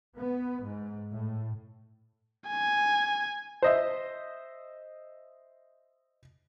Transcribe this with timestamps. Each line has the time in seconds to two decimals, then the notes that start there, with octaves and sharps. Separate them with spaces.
0.17 B3
0.65 G#2
1.12 A2
2.48 G#5
3.62 C5 D#5 E5